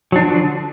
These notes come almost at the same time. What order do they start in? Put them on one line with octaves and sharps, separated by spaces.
F#3 D4 F3 D3